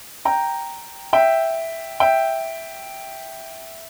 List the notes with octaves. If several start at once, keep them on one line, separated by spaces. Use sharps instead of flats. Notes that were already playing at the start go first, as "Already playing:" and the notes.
G5 A#5
E5 G5
E5 G5